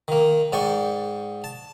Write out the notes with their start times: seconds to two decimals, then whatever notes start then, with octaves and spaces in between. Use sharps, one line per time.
0.08 D#3 A#3
0.53 G#2 D5 G5 C#6
1.44 A5